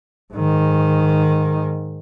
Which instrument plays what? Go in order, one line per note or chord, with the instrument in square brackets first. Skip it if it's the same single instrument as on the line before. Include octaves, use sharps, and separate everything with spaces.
[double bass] G#2 D#3